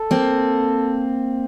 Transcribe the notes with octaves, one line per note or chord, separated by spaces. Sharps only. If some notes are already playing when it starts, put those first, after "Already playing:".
Already playing: A4
A#3 C4